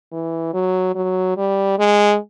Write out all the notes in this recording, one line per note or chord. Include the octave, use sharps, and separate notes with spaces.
E3
F#3
F#3
G3
G#3